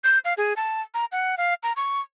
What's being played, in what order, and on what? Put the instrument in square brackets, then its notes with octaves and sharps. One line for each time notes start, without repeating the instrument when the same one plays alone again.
[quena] G6
F5
G#4
A5
A#5
F#5
F5
A#5
C#6